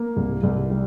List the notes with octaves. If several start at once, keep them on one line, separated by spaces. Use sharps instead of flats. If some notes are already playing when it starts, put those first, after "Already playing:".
Already playing: A#3
C2
C2
G3